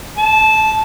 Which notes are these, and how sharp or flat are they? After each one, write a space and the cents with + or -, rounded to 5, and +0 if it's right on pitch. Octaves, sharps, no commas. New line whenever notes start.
A5 -15